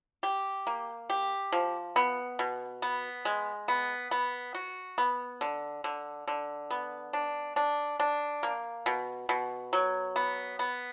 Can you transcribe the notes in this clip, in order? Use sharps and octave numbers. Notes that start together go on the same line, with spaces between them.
G4
A#3
G4
F3
B3
B2
B3
G#3
B3
B3
F#4
B3
D3
D3
D3
B3
D4
D4
D4
A#3
B2
B2
F#3
B3
B3